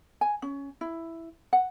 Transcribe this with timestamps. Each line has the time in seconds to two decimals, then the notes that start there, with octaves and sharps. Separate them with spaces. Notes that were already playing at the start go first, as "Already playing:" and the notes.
0.21 G#5
0.42 C#4
0.81 E4
1.53 F#5